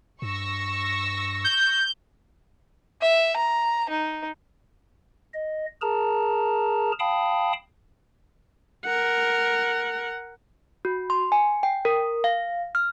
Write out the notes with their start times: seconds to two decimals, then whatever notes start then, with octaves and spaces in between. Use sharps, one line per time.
0.22 G2 C#6 E6 A#6
1.44 G6
3.02 E5
3.36 A#5
3.90 D#4
5.34 D#5
5.82 G#4 A#4 A5 A#5
7.00 F5 G5 A5 B5 D#6
8.85 A#4 F#5
10.85 F#4
11.10 C6
11.32 G#5
11.63 G5
11.85 A#4
12.24 F5
12.75 F6